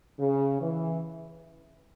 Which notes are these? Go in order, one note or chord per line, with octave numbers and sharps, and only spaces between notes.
C#3
E3